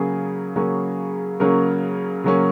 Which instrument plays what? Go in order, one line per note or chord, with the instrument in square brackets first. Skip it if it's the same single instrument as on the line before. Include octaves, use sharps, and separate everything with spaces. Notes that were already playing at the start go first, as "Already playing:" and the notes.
Already playing: [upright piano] C#3 F#3 A#3 C#4 G#4
C#3 F#3 A#3 C#4
C#3 F#3 A#3 C#4 A#4
C#3 F#3 A#3 C#4